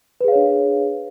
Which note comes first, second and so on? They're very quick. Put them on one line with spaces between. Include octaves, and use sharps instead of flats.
B4 G#4 F5 C#5 D4